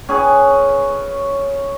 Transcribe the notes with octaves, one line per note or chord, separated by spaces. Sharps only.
C#4 G#4 B4